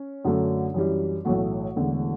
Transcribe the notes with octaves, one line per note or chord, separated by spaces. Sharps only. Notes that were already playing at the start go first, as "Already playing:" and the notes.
Already playing: C#4
F#2 D3 F#3 A3 D4
F#2 E3 G3
B1 A2 E3 A3 F#4
E1 E2 D3 A3